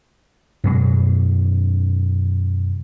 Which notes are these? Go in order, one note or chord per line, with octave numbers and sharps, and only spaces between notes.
F#2 B2 G#3